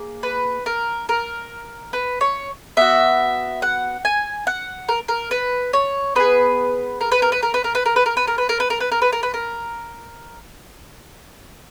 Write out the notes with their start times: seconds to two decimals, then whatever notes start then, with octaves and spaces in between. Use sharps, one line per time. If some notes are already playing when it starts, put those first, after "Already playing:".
Already playing: A#3 G#4
0.23 B4
0.66 A#4
1.09 A#4
1.93 B4
2.21 C#5
2.77 B3 F#4 E5
3.62 F#5
4.05 G#5
4.47 F#5
4.89 A#4
5.08 A#4
5.31 B4
5.73 C#5
6.15 B3 D#4 G#4 B4
7.01 A#4
7.12 B4
7.22 A#4
7.32 B4
7.43 A#4
7.54 B4
7.64 A#4
7.75 B4
7.86 A#4
7.96 B4
8.06 A#4
8.17 B4
8.27 A#4
8.38 B4
8.49 A#4
8.60 B4
8.70 A#4
8.80 B4
8.92 A#4
9.02 B4
9.12 A#4
9.23 B4
9.34 A#4